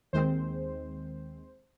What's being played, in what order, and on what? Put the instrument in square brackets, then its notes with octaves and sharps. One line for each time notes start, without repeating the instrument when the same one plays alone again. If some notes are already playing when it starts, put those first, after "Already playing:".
[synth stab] D#2 D#3 G#3 C4 C5